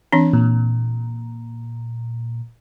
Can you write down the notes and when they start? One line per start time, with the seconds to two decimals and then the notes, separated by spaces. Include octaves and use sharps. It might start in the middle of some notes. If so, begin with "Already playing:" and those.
0.13 E3 C4 D4
0.33 A#2